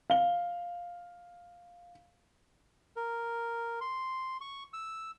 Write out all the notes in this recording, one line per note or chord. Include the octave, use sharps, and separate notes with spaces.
F5 G7
A#4
C6
C#6
E6